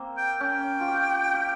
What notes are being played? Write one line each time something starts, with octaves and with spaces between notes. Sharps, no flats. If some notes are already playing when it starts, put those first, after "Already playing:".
Already playing: A#3 C4
G5
C#4 G5
F4
G4
G4